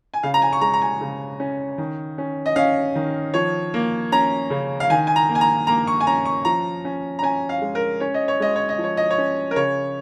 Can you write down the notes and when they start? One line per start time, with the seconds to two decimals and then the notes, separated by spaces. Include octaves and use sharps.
0.14 G#5
0.23 C#3 F5
0.34 A#5
0.42 G#5
0.53 C#6
0.61 G#3 A#5
0.73 A#5
0.82 G#5
1.01 C#3
1.40 C#4
1.78 D#3
2.18 C#4
2.46 D#5
2.56 C#4 F5
2.95 D#3
3.34 F3 C#5
3.74 A#3
4.12 C#4 A#5
4.50 C#3
4.80 F5
4.90 D#3 G#5
5.07 G#5
5.16 A#5
5.29 A#3
5.35 G#5
5.41 A#5
5.67 A#3 A#5
5.87 C#6
6.01 G#5
6.07 C#4 A#5
6.25 C#6
6.45 F3 A#5
6.85 C#4
7.19 A#5
7.23 C#4 G#5
7.49 F5
7.61 G#3
7.75 A#4
8.00 C#4 C#5
8.14 D#5
8.28 C#5
8.40 G#3 D#5
8.56 C#5
8.69 D#5
8.79 F3
8.84 C#5
8.97 D#5
9.11 C#5
9.18 C#4
9.51 A#4
9.56 C#3 C#5